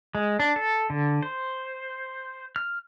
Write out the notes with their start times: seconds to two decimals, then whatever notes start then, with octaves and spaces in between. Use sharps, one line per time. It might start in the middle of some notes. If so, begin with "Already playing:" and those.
0.15 G#3
0.39 D4
0.56 A4
0.90 D3
1.23 C5
2.56 F6